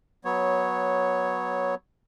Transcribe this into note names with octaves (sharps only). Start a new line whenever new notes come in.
F#3 B3 C#5